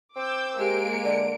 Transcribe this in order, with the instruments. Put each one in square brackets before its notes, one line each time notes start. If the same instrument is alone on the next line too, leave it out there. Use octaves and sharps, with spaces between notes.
[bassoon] C4 [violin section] D6 E6 G6
[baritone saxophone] G#3 [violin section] A#3 D7 [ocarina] G4
[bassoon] D3 [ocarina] D5